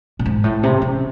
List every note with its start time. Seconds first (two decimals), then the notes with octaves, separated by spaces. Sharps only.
0.19 A2
0.26 G#2
0.44 A2
0.63 C3
0.82 C#3